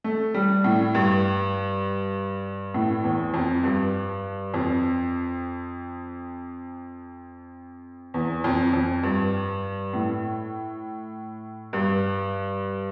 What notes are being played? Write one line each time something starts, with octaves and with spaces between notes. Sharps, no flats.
A3
G3
A2
G2
A2
E2
F2
G2
F2
E2
F2
F2
G2
A2
G2